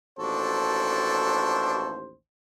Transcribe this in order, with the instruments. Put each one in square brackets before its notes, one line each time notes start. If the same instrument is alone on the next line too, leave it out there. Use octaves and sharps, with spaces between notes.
[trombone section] A1 D#2 C5 [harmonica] D4 F#4 A4